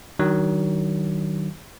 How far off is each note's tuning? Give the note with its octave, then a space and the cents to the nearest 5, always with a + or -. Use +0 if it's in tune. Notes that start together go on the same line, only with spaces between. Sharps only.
D#3 +0 F#3 +35 D4 +0